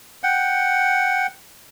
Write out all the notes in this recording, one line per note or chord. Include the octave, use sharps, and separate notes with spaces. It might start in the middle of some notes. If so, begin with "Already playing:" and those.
F#5 G5